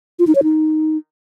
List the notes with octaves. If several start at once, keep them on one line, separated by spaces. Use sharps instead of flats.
F4
D#4
C#5
D#4